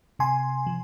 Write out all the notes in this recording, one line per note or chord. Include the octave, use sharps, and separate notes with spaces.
C3 G#5 C6
F3